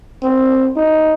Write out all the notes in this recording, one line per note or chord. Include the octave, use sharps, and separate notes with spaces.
C4
D#4